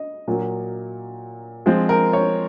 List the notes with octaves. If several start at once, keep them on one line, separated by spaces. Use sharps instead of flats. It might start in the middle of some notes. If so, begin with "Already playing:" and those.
Already playing: D#5
A#2 F#3 A#3
F3 G#3 C4 C5
A#4
C#5